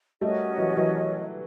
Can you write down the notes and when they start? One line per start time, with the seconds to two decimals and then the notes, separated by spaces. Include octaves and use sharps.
0.21 G3 A3 C#4 F#4 A#4 D#5
0.58 E3 F#3
0.77 E3 F#3